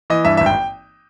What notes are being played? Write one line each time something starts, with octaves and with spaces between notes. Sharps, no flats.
E3 D#5
G2 E5
G#1 E5
G5